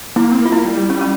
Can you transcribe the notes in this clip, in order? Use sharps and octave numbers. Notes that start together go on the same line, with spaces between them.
A#3 E4
C4
A#3
F4
E4
G3
C#4
C#4